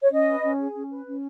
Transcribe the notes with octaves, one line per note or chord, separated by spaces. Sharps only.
C#5
C#4 D#5
B4
C#4
G#4
C#4
B4
C#4